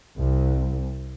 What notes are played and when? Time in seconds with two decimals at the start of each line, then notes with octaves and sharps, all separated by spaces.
0.17 C2